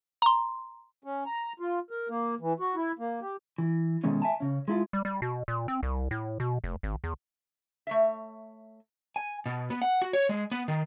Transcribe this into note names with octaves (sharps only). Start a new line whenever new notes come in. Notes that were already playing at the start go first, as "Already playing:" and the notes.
A#5 C6
C#4
A#5
F4
A#4
A#3
E3
F#4
E4
A#3
G4
E3
B2 D#3 G#3 A3 C#4
E5 G#5 A5
C#3 C#4
G#3 E4 F4
G3
G3
B2
A#2
C4
C2
A2
B2
F1
G#1
E2
A3 C#5 E5
G#5
B2
B3
F#5
F#4
C#5
G#3
B3
D#3